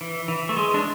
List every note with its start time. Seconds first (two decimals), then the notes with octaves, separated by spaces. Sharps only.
0.01 E3
0.28 E3
0.49 A3
0.57 G#3
0.74 D4